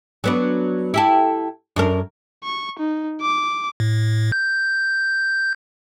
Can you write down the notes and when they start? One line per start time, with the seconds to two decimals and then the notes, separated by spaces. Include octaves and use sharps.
0.24 F#3 B3 D4
0.94 E4 G4 A4
1.76 F#2 D4 A#4
2.44 C#6
2.79 D#4
3.21 D6
3.80 A2
4.32 G6